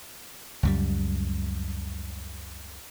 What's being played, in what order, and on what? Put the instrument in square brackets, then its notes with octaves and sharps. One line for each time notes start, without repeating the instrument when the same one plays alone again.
[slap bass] C#2 F#2 G3